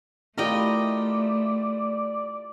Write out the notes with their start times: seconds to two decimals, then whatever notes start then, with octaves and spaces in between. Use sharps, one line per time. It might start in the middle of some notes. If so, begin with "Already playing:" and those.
0.38 A3 E4 F4 G4 A#4 D5 D#5 G5